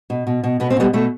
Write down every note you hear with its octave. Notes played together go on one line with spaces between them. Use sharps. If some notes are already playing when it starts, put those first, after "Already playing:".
B2
B2
B2
B2 B3
C4
B2 G3 B3
B2 A3